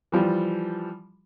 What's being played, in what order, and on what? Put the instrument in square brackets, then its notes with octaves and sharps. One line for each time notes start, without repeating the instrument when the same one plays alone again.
[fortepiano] E3 F3 G3